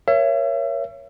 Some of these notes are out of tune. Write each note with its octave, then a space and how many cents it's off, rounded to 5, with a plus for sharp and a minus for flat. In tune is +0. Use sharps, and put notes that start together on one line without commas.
A#4 +25 C#5 +0 E5 +35